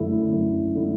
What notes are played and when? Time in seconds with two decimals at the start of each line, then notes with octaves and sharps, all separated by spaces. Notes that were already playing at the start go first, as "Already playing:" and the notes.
Already playing: F#2 D3 A3 E4
0.32 F#2
0.75 D3 A3 E4